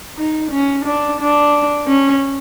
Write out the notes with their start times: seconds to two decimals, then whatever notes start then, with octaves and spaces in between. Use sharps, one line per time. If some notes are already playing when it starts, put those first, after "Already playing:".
0.17 D#4
0.51 C#4
0.85 D4
1.20 D4
1.87 C#4